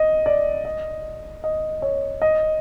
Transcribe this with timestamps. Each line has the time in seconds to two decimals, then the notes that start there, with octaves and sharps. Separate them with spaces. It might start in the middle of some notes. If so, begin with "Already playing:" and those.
Already playing: D#5
0.26 D5
0.65 D#5
1.44 D#5
1.82 C#5
2.21 D#5